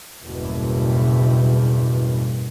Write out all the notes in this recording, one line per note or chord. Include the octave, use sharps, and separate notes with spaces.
F#1 E2 G2 B2